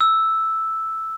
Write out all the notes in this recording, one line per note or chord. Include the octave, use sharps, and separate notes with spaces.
E6